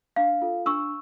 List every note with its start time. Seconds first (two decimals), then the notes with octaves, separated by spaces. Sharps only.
0.16 D4 F5
0.42 F4 A4
0.66 D4 C#6 E6